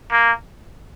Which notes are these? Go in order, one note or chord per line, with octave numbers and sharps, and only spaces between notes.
A#3